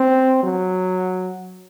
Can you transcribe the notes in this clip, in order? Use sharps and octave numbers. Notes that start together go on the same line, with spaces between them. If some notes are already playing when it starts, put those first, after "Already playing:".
Already playing: C4
F#3